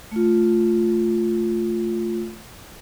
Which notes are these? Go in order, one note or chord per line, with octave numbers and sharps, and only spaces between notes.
A3 F4